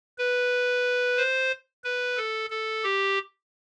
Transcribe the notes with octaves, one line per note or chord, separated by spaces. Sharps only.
B4
C5
B4
A4
A4
G4